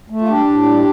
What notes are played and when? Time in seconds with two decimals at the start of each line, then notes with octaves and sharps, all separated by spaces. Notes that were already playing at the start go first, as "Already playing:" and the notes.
0.10 A3
0.21 F4
0.28 G3 D4 G4
0.47 A2
0.66 G3